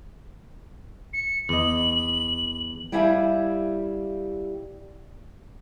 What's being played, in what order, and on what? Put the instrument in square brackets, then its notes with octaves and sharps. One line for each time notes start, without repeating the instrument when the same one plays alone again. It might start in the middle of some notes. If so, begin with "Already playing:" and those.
[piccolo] C#7
[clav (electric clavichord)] E2 D#5 [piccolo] F#7
[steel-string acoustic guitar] G3 E4 G4 E5 F5 G#5